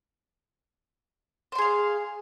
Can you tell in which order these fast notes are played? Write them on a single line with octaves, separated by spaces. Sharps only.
C5 C6 G#4 F5